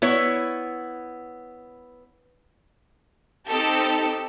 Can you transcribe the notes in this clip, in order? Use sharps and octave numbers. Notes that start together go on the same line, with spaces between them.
B3 E4 C#5
C4 D#4 G4 A4